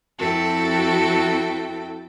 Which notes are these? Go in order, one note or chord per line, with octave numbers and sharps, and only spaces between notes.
F2 C4 E4 F#4 A4 G5